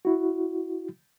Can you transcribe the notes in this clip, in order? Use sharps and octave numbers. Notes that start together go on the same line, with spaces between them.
E4 F#4